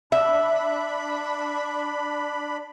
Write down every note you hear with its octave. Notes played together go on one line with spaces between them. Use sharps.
D4 E5 B5